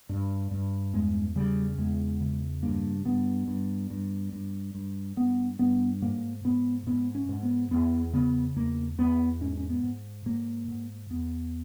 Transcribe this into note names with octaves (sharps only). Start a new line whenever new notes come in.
G2
G2
E2 G#3
C#3 G3
E2 G#3
C#3
G2 A#3
G2 B3
G2
G2
G2
G2
G2 B3
G2 B3
G#2 A#3
G#2 B3
G#2 B3
C#4
G#2
B3
E2 B3
C#3 B3
E2 A#3
E2 B3
G#2 C#4
C#4
B3
G#2
G#2 A#3
G#2
E2 B3